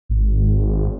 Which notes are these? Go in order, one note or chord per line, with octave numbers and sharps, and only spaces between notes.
G#1